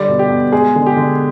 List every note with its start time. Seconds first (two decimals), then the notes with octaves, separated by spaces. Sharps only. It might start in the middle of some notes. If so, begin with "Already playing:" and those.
Already playing: D3 G3 D5
0.08 B2
0.19 G4
0.30 B2
0.52 G#3 G#4
0.76 D3
0.86 G4
0.97 D3